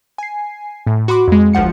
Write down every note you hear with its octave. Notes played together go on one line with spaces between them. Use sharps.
G#5 C7
A2
F#4 B5 C6 D6
F2 G#3
G1 D2 F3 F#5 C#7